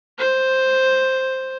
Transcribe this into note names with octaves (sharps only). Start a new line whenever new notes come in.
C5